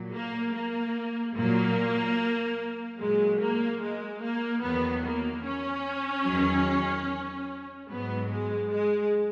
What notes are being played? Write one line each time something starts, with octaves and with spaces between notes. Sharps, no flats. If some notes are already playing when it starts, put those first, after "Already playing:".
Already playing: A#2 F#3
A#3
A#3
A#2 F#3 A#3
A#2 F#3 G#3
A#3
G#3
A#3
E2 D#3 F#3 B3
A#3
C#4
E2 D#3 F#3
G#2 F#3 B3
G#3
G#3